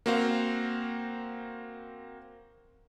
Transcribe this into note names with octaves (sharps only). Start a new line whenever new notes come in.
A#3 C4 F#4 C5 F5